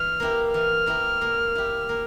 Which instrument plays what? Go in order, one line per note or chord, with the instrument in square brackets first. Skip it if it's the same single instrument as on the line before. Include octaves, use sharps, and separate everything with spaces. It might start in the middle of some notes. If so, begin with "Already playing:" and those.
Already playing: [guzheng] E3 [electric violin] F6
[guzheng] A#3 E4 G4 A#4
[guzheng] E3 [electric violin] F6
[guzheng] A#3 E4 G4 A#4
A#3
E4 G4
A#3